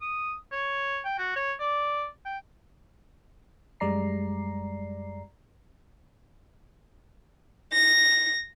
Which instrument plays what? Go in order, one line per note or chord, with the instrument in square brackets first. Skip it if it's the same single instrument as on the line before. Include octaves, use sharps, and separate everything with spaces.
[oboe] D#6
C#5
G5
F#4
C#5
D5
G5
[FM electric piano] F#2 G3 G#3 D5 A#5 C7
[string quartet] A#6